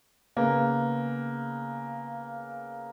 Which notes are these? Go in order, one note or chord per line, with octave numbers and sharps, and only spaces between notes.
C#3 A#3 B3